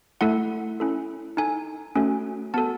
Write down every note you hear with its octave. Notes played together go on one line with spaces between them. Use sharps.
A3 E4 A4 F#5
C#4 E4 A4
D#4 A4 G#5
A3 C#4 F#4 A4
B3 F#4 A4 A5